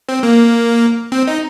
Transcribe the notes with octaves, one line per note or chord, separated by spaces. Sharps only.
C4
A#3
C4
D#4